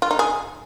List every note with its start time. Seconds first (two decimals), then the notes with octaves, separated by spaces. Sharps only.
0.02 F4
0.11 D#4
0.19 G#4